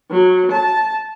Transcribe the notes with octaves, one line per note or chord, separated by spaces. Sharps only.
F#3
A5